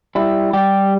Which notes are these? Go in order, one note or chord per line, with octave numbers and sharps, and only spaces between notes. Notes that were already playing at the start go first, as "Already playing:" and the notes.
G3 E4
G3 G4